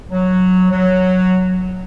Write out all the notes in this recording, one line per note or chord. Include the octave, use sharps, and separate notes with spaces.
F#3
F#3